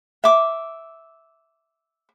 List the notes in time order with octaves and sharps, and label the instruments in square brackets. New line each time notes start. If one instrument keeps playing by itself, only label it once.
[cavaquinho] E5 D6